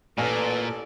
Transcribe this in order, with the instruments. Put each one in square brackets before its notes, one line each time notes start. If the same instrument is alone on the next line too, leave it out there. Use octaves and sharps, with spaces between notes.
[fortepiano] A1 G#5 F6 [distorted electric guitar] A#2 [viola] A4 D5 [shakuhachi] B4